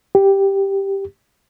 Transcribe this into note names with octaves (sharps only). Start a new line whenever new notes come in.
G4